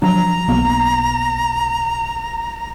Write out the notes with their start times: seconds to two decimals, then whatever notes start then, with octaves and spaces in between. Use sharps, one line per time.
0.02 F3 F#3 D4 A#5
0.48 B1 A#3 B3